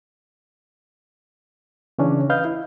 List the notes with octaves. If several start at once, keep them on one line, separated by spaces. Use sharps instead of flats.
C#3 E3 C#4 D4
B4 D#5 F5 F6 G6
E4